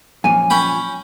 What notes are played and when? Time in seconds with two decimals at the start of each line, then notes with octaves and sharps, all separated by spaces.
0.24 F#2 A#2 F3 G#5
0.50 C#4 G5 B5